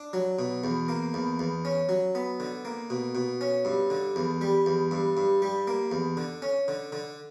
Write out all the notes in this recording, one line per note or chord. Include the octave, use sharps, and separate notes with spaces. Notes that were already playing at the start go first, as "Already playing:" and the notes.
Already playing: D4
F#3
B2
E2
A#3
E2
E2
C#4
F#3
B3
D3
A#3
B2
B2
C#4
G2
D3
E2
G3
E2
G2
G2
G3
A#3
E2
D3
C#4
D3
D3